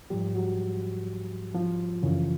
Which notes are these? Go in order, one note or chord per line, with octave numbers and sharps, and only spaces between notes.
G#2 F3 G3 G4
F#3 F#4
F3 F4
F#2 C#3 E3